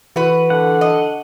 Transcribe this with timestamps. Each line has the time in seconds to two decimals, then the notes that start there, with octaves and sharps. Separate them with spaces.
0.16 E3 F#4 B4
0.50 D3 F#5
0.81 D#5